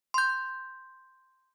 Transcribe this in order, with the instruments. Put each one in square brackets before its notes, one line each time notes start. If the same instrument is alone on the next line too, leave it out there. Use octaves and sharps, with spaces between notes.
[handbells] C6 G6